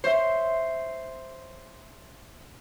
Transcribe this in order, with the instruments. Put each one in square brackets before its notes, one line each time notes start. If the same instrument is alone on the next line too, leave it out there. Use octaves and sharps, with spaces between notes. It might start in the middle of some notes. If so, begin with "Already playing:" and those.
[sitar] C5 [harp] C#5 E5